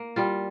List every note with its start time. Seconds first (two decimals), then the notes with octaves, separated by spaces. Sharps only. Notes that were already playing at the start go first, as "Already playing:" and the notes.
Already playing: A#3
0.16 G3 F4